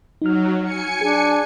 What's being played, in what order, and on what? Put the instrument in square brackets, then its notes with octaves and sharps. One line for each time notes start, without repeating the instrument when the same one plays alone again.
[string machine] F#3 [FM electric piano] D#4 F6
[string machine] G#5 C#7
[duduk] D4 [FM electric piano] G#4